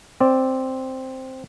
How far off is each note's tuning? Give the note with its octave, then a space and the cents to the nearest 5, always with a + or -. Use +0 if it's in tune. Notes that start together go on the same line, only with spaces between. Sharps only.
C4 +0 D5 +0